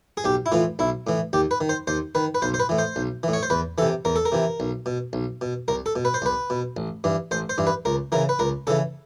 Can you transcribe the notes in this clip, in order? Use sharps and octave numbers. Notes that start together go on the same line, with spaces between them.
G#4
B1 G4
E4
A2 E3 F4
B1 E4
A2 E3
D#2 G4
B4
D#3
C5
D#2 C5
D#3 B4
B4
B1 C5
C5
B4
A2 E3
C5
B1
A2 E3
C#5
C5
E2 B4
C3 E3 A4
E2 A#4
A4
A#4
C3 E3
B1
B2
B1
B2
C2 A#4
A4
B2
B4
C5
C2 B4
B2
A1
G2 E3
A1 C5
C5
G2 E3
B4
C#2 A#4
C#3 E3 A#4
B4
C#2 A#4
C#3 E3 A4